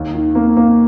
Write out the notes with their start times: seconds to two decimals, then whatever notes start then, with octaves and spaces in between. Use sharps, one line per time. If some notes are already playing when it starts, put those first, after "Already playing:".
Already playing: D#2
0.14 D#3
0.35 A#3
0.57 A#3